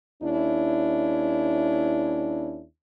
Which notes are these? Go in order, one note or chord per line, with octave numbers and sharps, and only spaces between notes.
D#2 C#4 D4 E4